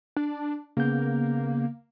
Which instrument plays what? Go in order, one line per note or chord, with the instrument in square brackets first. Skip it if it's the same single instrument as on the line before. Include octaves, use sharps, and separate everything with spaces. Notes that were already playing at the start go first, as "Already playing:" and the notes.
[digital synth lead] D4
[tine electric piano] C#3 B3 G6 [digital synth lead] A#3